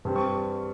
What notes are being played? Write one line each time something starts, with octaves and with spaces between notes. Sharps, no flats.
G2 G3 C4
C#6